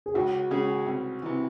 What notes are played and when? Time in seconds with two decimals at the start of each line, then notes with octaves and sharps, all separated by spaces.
0.06 G#4
0.14 C#2 F#4
0.51 C#3 G#3 C#4 G#4
0.86 C2
1.22 C3 E3